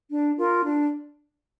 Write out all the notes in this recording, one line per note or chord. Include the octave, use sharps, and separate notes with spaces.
D4
F4 A#4
D4